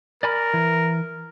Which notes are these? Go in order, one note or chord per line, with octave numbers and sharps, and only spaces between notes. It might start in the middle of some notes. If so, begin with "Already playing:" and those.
A#4 D5 G#5 B5
E3